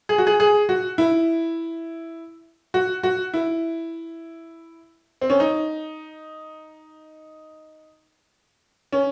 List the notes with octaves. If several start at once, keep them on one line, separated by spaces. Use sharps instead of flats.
G#4
F#4
G#4
G#4
F#4
E4
F#4
F#4
E4
C4
C#4
D#4
C#4